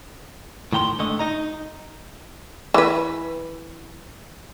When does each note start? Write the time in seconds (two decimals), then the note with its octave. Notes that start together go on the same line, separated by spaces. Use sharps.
0.73 A2 D#3 G5 A#5 C6
0.99 G#2 D3 A3 D#5
1.19 D#4 D#5 A#5
2.74 E3 B4